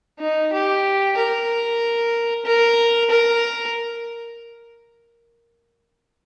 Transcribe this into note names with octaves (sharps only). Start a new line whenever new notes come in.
D#4
G4
A#4
A#4
A#4